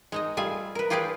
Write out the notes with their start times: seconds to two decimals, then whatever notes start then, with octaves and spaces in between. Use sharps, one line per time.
0.12 G#3 D#4 D#5
0.37 G3 A3 F4 G#4 G#5
0.75 A#4 B4
0.90 F4 G4 G#4 B4 D5 F5